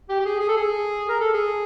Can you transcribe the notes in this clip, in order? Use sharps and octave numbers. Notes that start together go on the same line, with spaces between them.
G4
G4
G#4
G#4
A4
G#4
A#4
A4
G#4